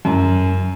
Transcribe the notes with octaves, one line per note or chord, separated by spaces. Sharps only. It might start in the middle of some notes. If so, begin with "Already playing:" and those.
F#2